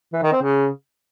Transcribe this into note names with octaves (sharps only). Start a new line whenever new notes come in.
E3
D#3
C4
C#3